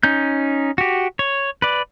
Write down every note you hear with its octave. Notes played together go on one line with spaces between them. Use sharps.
C#4 D#4 G6
F#4 G4
C#5
B4 D5